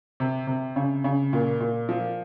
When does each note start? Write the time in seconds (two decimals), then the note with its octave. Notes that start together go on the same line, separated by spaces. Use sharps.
0.20 C3
0.47 C3
0.76 C#3
1.04 C#3
1.33 A#2
1.60 A#2
1.89 F3